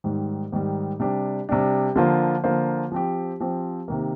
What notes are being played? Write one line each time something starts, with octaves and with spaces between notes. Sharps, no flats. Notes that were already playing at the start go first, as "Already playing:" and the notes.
G#2 D#3 G3
G#2 D#3 G3
C3 G3 D4 G4
C3 G3 D4 G4
D3 F3 A#3 F4 C5
D3 F3 A#3 F4 C5
F3 C4 G4
F3 C4 G4
C3 D#3 A#3